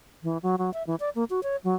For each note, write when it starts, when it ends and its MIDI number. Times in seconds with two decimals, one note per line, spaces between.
0.23 0.38 52
0.43 0.56 54
0.58 0.73 54
0.74 0.83 76
0.87 0.95 52
1.00 1.09 74
1.15 1.24 58
1.30 1.40 66
1.43 1.56 73
1.64 1.75 54